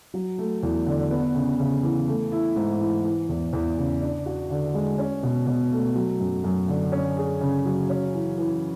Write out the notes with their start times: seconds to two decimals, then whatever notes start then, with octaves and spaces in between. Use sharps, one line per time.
0.14 F#3
0.38 A3
0.63 E2
0.86 D3
1.11 B3
1.35 C#3
1.59 C#3
1.83 E3
2.08 A3
2.32 E4
2.56 G#2
2.80 E3
3.04 E3
3.29 E2
3.53 E2
3.78 C#3
4.02 D4
4.26 F#4
4.50 D3
4.74 G#3
4.98 C#4
5.23 B2
5.47 B2
5.72 A3
5.95 F#3
6.20 F#2
6.44 F#2
6.68 D3
6.92 C#4
7.17 G#4
7.41 C#3
7.66 F#3
7.89 C#4
8.14 E3
8.38 E3